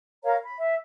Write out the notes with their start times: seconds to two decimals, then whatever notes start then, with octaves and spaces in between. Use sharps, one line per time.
0.24 A#4 C#5 F5 A#5
0.44 B5
0.58 E5